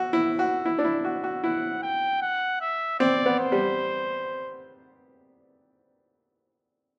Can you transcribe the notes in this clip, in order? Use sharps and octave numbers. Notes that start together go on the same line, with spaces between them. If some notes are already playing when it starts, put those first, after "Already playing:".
Already playing: F#4 E5
E4
F#4
E4
D4
E4
F#4
F#4
E4 F#5
G5
F#5
E5
C4 D5
B3
C5
G3